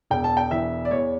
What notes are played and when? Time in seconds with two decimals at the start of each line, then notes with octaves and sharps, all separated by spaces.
0.10 E1 G5
0.24 A5
0.37 G5
0.51 E3 E5
0.85 D5
0.91 E2 C#5